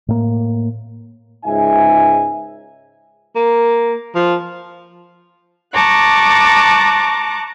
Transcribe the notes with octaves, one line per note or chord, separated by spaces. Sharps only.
A2 A#3
C#2 G#2 D#4 E5 G#5
A#3
F3
A5 A#5 C#6 D6 F#6